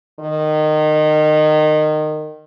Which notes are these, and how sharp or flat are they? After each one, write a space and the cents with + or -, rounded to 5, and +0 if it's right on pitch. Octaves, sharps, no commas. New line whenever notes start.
D#3 -20